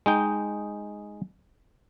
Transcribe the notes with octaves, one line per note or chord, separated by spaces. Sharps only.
G#3 D#4 G5